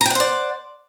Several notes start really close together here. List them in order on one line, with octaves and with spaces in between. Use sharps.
A#5 G5 F#5 C5 D5